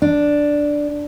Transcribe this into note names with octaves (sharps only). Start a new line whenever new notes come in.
D4